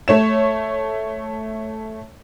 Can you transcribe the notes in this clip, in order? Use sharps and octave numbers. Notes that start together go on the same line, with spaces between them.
A3 C#5 E7